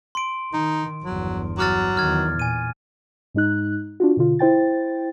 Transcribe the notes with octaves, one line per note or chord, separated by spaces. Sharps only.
C6 D7
D#3 D#4
G1 E2 F#3
F#3 D6 F6 A6
E2 D#3 F6 G#6
A#2 G#5 D#7
G#2 G#3 D#4 F#6
D4 F4 F#4
B2 D3 F4
E4 C5 G5 A6